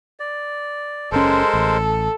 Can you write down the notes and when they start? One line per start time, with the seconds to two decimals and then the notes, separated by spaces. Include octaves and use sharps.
0.20 D5
1.12 F#1 G#3 C#4 A4 A#4 C5
1.54 A1